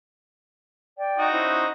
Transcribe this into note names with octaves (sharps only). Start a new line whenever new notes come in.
D5 G5
D#4 F#4 D#5
C#4 E4 C5